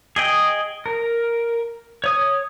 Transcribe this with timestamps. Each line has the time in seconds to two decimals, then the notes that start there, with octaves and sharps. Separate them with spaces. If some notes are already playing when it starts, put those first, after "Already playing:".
0.16 G#4 D#5 G5
0.86 A#4
2.04 C#5 D#6